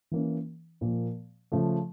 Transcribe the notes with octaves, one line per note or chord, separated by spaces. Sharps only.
E3 A#3 C#4
A#2 F3 A#3
C#3 F3 A3